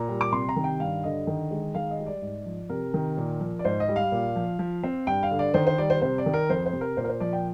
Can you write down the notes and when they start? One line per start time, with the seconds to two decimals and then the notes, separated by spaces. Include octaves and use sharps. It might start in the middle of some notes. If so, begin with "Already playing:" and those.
Already playing: A#2 A#5
0.09 G3
0.21 D6
0.32 C3 C6
0.49 A#5
0.56 D#3
0.64 G5
0.80 G2 F5
1.03 D3 D#5
1.27 D#3
1.51 G#3
1.75 D#3 F5
1.91 D#5
1.99 G3
2.07 D5
2.22 G#2
2.46 F3
2.69 C3 A#4
2.94 D#3
3.17 A#2
3.40 F3
3.59 D5
3.65 G#2 C5
3.80 D#5
3.89 G3
3.96 F5
4.12 A#2
4.36 F3
4.59 F3
4.83 C4
5.07 G2 G5
5.23 F5
5.31 D3
5.39 D5
5.54 D#3 C5
5.67 C5
5.78 G3 D5
5.90 C5
6.02 C3 C5
6.18 D5
6.26 D#3
6.34 A#4
6.50 F2 C5
6.66 C5
6.73 C3
6.81 A#4
6.97 A#2 C5
7.04 A#4
7.09 C5
7.20 F3 D5
7.33 G5